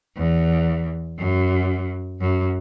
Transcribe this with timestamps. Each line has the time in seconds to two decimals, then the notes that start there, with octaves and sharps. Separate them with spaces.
0.16 E2
1.18 F#2
2.20 F#2